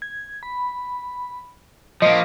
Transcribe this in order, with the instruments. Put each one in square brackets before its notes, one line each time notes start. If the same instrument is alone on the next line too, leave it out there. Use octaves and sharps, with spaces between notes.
[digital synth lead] G#6
B5
[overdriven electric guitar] F3 A#3 [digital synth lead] D#5